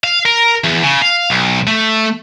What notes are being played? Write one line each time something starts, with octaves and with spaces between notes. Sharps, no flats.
F5
A#4
E2
C#3
F5
B1
A3